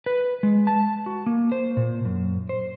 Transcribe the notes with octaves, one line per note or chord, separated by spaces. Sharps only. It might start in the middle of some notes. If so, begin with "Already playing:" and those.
B4
G#3
A5
F#4
A#3
C5
A#2
F#2
C5